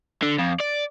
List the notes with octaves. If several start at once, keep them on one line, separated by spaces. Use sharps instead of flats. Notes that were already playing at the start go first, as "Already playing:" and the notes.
D3
F2
D5